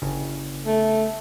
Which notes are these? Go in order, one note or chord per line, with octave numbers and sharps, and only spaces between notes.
G1 C#3
A3